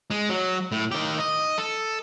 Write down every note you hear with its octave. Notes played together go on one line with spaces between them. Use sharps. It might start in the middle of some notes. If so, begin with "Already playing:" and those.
G#3
F#3
A2
D#3 G4
D#5
A4